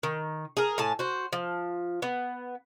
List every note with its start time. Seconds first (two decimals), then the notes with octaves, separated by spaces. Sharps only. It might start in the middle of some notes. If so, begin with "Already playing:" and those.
0.03 D#3
0.57 G#4 A#4
0.78 A2 G#5 A5
0.99 F#4 C5
1.33 F3
2.02 B3